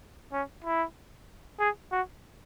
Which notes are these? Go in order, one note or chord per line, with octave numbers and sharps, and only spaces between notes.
C#4
E4
G#4
F#4